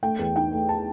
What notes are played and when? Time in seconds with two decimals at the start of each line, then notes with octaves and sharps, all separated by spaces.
0.03 A3 G5
0.19 E2
0.36 D#4 G5
0.52 A3
0.69 A5